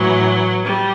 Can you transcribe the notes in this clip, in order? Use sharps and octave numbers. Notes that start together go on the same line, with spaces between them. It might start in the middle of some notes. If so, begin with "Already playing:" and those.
Already playing: A2 E3 F#3
G3